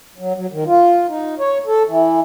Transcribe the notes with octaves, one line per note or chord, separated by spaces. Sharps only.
F#3
F#3
D#3
F4
D#4
C#5
A4
E3